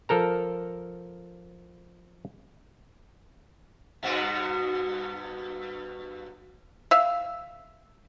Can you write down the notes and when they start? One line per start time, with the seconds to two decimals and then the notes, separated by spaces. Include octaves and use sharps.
0.09 F3 A4 A#4 A#5
4.03 G2 B2 F#4
6.91 E5 F5